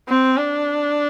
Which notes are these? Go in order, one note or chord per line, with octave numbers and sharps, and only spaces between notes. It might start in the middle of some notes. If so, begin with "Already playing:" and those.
C4
D4